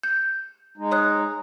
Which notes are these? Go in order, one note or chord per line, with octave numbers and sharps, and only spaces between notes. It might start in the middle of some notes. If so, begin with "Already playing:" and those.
G6
G#3 D#4
C#5 D#6 F#6